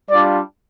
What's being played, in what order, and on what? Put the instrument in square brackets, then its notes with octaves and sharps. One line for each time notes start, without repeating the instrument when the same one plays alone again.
[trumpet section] G3 D4 F4 D5